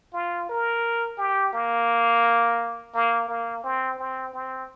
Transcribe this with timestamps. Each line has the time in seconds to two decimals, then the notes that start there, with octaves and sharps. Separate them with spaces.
0.14 F4
0.50 A#4
1.18 G4
1.53 A#3
2.94 A#3
3.29 A#3
3.64 C4
3.99 C4
4.34 C4